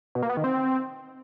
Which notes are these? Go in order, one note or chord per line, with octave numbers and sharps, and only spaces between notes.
B2
A#3
B3
D#3
C4